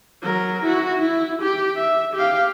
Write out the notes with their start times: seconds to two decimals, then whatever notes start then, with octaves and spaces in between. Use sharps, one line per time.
0.22 F#3 A#4
0.65 E4 F#4
0.99 E4
1.42 G4
1.77 E5
2.14 G4 F5